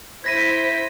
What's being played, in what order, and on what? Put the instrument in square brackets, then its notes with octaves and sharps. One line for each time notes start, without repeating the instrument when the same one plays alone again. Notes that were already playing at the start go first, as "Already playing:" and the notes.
[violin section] E4 C5 B6 [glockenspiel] G#6 A#6 D#7